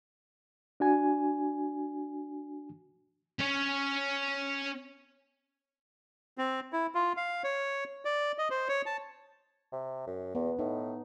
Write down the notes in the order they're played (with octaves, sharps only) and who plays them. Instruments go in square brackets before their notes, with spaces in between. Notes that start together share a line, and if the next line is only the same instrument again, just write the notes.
[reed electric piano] D4 F#4 G#5
[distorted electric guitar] C#4 C#5
[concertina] C4
E4
F4
F5
C#5
D5
D#5
C5
C#5
A5
[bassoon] C3
F#2
[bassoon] E2 [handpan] B3
[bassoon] A2 [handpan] D#4